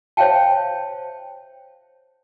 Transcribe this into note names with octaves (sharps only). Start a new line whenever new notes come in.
C5 C#5 E5 F5 G5 A5